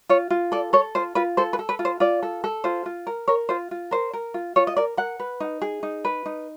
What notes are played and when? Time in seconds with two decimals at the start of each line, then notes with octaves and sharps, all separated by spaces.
0.09 F4 C#5
0.30 F4
0.52 A4 D5
0.73 A4 C#5
0.95 F4 C5
1.15 F4 B4
1.37 A4 C5
1.53 B4
1.59 A4
1.69 B4
1.79 F4
1.85 C5
2.00 F4 D5
2.23 A4
2.44 A4
2.64 F4 C5
2.86 F4
3.07 A#4
3.28 A#4 C#5
3.49 F4 C5
3.71 F4
3.91 A#4 C5
4.13 A#4
4.34 F4
4.56 F4 C#5
4.67 D#5
4.76 A#4 D5
4.97 A#4 F#5
5.20 B4
5.40 D#4
5.62 G#4
5.83 D#4
6.05 B4
6.26 D#4